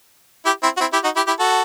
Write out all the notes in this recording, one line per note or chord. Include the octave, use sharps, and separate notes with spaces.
E4 G4
C4 E4
F#4
C4 E4
E4 G4
D#4 F#4
E4 G4
E4 G4
F#4 A4